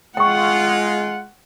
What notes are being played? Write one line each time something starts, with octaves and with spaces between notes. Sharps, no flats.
G#3 F4 F#5 G5 C#6